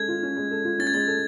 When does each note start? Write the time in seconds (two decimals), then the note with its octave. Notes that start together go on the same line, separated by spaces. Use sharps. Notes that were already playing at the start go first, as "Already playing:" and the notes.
Already playing: G#3 C#4 A4 G#6
0.09 F4
0.23 C#4
0.37 G#3
0.51 A4
0.65 F4
0.79 C#4 A6
0.87 G#6
0.94 G#3 A6
1.07 A4